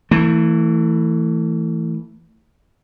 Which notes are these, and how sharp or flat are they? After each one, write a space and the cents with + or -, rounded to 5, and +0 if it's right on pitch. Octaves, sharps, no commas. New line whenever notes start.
E3 -5 A3 +25